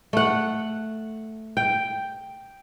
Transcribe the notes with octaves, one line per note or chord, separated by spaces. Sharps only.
A3 F#5
G5